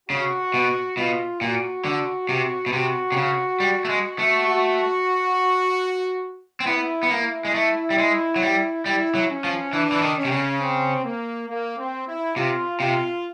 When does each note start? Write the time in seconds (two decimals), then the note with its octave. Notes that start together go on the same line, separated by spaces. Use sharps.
0.09 C#3 F#4
0.54 B2
0.97 B2 F4
1.41 A#2 F#4
1.85 D3
2.29 C3
2.66 B2
2.72 C3 F#4
3.12 C3
3.17 C#3
3.60 G3
3.85 A3
3.89 G#3
4.19 A3
4.48 F#4
6.60 C4
6.66 B3 E4
7.03 B3
7.10 A#3 E4
7.45 G#3
7.55 A3
7.90 G3
7.98 G#3
8.36 F#3
8.42 G3
8.85 G3 E4
9.15 F#3
9.30 C#4
9.44 F3
9.73 E3 D4
9.92 E3
10.02 D#3
10.17 C#4
10.25 C3
10.32 C#3
10.61 C4
11.04 A#3
11.48 A#3
11.77 C4
12.07 E4
12.36 C3 F4
12.80 C3 F4